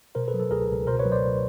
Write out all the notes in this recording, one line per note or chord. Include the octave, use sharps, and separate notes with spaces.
B2 A#4 C5
A4 B4
F#3
A4
C#2 G#4 A#4
C#2
B2 A#4 C5
B4 C#5
F#3
C5 D5